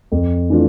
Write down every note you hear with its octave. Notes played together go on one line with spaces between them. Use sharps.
F2
E3 A3 D4 F4